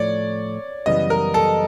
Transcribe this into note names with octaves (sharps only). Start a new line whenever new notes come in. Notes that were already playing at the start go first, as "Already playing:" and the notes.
Already playing: A2 F3 A3 C#5 D5
F#2 C#3 E3 G3 B3 D#5
A#4
A4